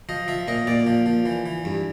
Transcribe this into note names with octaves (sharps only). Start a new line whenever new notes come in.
F3 D#5
F3 E5
A#2 D#5
A#2 D5
F3
F3
E3
E3
G2